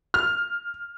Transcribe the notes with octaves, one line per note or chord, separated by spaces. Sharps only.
F6